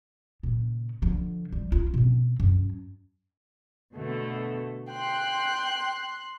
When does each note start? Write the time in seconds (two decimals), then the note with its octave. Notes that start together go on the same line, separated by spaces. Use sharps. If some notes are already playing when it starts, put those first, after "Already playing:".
0.43 A#2 C#3
1.02 D3 F3
1.53 G3
1.72 F4
1.94 B2 C4
2.40 F#2
3.93 B2 D3 A3
4.91 G5 C6 F#6